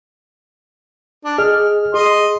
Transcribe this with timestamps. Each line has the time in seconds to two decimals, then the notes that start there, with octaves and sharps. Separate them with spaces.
1.25 D4
1.38 G#4 D#5 F6
1.94 G#4 D#5 C6